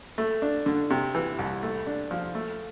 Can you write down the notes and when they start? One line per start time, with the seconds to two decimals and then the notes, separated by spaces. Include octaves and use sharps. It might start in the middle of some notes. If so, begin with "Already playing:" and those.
0.18 A3
0.42 D4
0.66 D3
0.90 C3
1.15 E3
1.39 C2
1.63 A3
1.87 D4
2.11 F3
2.35 A3